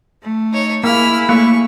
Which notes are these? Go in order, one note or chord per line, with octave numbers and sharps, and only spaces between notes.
A3
D#4 C#5
A#3 E4 G#4 E6 F6
A3 A#3 C#6